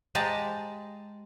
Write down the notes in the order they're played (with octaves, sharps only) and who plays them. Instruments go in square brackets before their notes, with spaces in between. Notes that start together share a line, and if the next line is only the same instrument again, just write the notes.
[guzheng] G#3 G4 A5 A#5